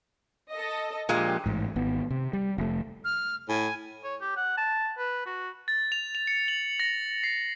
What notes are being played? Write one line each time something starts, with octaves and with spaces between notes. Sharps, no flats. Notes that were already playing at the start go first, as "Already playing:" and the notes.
A4 D#5
A#2 F3 G#3 D4 G4
A1 G#2
G#1 B3
C3
G3
F1 A3
F6
A2 G#5
C#5
G4
F#5
A5
B4
F#4
A6
F7
F7
C#7
F#7
A#6
C7